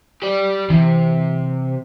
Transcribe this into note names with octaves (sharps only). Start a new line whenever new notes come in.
G4 D5
C3 E3